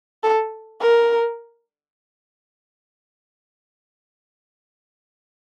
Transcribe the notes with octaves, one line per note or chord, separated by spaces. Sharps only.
A4
A#4